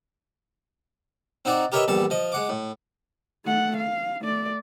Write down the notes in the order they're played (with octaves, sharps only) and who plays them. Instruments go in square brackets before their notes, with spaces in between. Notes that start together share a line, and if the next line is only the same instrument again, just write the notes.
[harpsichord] C4 D#4 F#4 D5
G4 A#4 B4 C#5 D#5 E5
A#1 E2 G3 A4 A5
F3 D#5
G#3 F#5 D6
A2
[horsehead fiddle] A3 F#5
F5
A3 D5